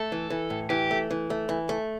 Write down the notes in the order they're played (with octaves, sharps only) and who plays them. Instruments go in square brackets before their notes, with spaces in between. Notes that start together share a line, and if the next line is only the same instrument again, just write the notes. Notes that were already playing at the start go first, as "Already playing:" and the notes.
Already playing: [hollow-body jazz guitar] A3 [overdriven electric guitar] A4
[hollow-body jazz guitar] E3
E3
A2
[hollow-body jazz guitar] E3 [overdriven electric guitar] G4
[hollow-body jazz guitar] A3
E3
A3
E3
A3